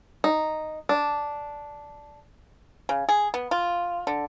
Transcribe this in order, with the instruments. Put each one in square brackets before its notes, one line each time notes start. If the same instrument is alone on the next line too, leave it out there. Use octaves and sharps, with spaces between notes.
[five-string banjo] D#4
D4
[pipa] C#3
G#4
B3
F4
D3